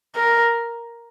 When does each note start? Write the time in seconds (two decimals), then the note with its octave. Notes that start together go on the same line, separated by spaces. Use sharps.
0.16 A#4